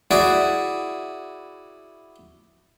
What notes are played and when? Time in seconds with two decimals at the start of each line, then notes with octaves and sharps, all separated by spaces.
0.11 E4 F#4 G#4 D5